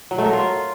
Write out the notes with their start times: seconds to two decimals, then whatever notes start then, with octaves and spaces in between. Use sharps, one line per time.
0.11 F#3
0.18 A3
0.26 A#4
0.33 F4